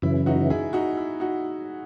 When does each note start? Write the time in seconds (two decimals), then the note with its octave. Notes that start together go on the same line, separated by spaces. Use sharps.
0.02 F#2 C#3 E3 E4
0.26 D#4 F#4
0.50 E4 G#4
0.73 D#4 F#4
0.97 E4
1.20 D#4 F#4